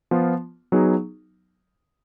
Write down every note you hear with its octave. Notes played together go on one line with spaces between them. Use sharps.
F3 B3 F4
F#3 B3 D#4 G#4